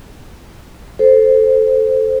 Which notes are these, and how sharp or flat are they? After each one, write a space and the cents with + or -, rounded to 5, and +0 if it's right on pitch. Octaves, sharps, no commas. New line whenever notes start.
A4 +0 C5 +0